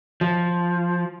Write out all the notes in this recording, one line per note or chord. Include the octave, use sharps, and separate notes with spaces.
F3